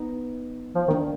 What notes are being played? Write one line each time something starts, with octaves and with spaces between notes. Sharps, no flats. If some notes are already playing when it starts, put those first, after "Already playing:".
Already playing: B3 D#4
F3
D#3
A#3 D4